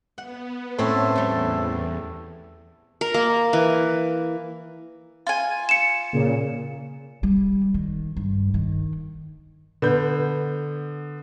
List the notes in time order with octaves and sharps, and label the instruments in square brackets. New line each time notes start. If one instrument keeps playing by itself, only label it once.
[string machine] B3 [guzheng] F#5
[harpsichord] A2 [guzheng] C4 C#4 E4 [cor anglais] A4
[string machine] E2 [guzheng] G3 A3
[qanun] A#4
A#3
E3
[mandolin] F4 G#5
[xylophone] C#7 E7
[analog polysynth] A#2 C#3
[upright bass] G3
D#3
G2
D#3
[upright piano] D3 B3 G6